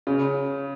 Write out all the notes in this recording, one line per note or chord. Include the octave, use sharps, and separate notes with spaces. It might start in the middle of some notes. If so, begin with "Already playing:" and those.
C#3